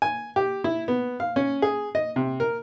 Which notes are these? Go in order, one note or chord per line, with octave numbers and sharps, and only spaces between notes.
G#5
G4
E4
B3
F5
C#4
G#4
D#5
C3
A#4